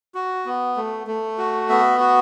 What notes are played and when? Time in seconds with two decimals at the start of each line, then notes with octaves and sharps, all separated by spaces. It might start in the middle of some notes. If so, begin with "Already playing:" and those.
0.15 F#4
0.46 B3
0.76 A3
1.07 A3
1.38 F#4
1.69 B3 E5
2.00 F#4